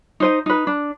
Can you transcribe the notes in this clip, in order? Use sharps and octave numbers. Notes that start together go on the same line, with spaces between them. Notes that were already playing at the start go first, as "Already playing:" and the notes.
D#4 C5 D#5
D#4 B4
D4